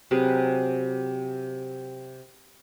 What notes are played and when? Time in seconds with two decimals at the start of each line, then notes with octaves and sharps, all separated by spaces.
0.11 C3 F#3 G#4 B4